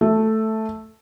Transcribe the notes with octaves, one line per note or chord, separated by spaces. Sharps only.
A3